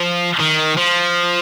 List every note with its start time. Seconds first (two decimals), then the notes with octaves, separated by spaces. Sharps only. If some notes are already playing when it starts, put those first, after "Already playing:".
Already playing: F3
0.40 D#3
0.77 F3